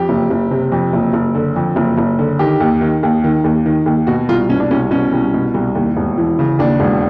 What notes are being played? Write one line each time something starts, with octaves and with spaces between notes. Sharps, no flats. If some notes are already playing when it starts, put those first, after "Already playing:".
Already playing: F2 G4
F#1
F#1
C3
F2
F#1
F#1
D3
F2
F#1
F#1
D3
D#3 G4
D#2
D#3
D#2
D#3
D#2
D#3
D#2
B2 F#4
C2 F4
B2 C#4
D4
C2 C#4
B2 C#4
C2
B2
C2
D#2
E1
E3
C#3
D#2 D4
E1